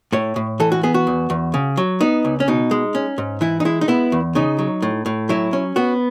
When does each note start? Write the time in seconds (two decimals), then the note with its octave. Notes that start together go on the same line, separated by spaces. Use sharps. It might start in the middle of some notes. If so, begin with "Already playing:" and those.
0.13 A2 C#5
0.36 A2
0.60 E3 A4
0.72 F#4
0.83 B3 G#4
0.94 F#4
1.07 E2
1.30 E2
1.54 C#3
1.77 F#3
2.01 B3 D#4
2.25 C#2
2.40 C#4
2.48 B2 D#4
2.71 G#3
2.95 C#4
3.18 G#2
3.41 E3 E4
3.60 D#4
3.65 G#3 E4
3.81 D#4
3.88 B3 E4
4.12 E2
4.35 C#3 D#4
4.59 F#3
4.82 A2
5.06 A2
5.29 F#3 E4
5.53 C#4
5.76 B3 F#4